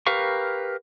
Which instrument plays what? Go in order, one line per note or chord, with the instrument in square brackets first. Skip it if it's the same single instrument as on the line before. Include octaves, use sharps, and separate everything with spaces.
[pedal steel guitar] G4 A#4 B4 F5 C#6